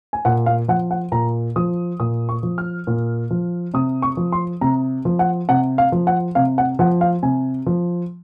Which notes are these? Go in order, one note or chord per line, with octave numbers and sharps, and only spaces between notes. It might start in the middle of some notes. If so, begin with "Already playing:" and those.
G#5
A#2 F#5
F5
F3 F#5
F#5
A#2 A#5
F3 D#6
A#2 D#6
C#6
F3
F6
A#2
F3
C3 D#6
C#6
F3
C6
C3 A#5
F3
F#5
C3 F#5
F5
F3
F#5
C3 F5
F#5
F3 F#5
F5
C3 G#5
F3